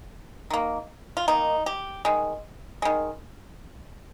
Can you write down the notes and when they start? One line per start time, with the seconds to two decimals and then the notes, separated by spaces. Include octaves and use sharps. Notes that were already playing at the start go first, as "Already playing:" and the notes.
0.50 D#3 A#3
1.17 F4
1.28 D#3 A#3 D#4
1.66 G4
2.05 D#3 G#3
2.82 D#3 G#3